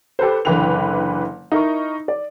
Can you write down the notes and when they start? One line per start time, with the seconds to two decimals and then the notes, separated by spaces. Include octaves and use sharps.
0.19 G4 A4 B4 C5
0.45 F#1 D3 E3 B4 G5 F7
1.52 D#4 E4 A#4 C#6
2.08 D5